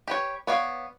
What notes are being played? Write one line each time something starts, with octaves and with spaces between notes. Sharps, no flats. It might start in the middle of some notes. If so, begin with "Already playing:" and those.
G4 B4 C#5
B3 C#5 D5 F5